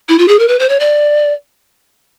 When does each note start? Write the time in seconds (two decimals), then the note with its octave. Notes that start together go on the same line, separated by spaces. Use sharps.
0.09 E4
0.18 F4
0.28 G#4
0.39 A#4
0.48 B4
0.59 C5
0.69 C#5
0.80 D5